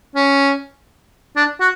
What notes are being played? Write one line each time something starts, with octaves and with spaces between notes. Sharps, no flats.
C#4
D4
F#4